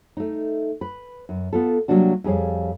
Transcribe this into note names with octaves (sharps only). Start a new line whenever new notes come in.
A3 D#4
B4
F#2
B3 F4 A4
C3 F#3 G3 A#3 D4 F#4
F2 G3 G#4 C#5 F5